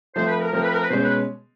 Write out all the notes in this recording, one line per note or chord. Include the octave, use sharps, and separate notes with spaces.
F3 A3 C4 C5
B4
A#4
F3 A3 C4 A#4
B4
A#4
B4
B2 G#3 C#4 C5
B4